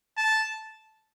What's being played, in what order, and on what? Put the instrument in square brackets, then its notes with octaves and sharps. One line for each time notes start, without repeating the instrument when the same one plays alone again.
[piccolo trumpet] A5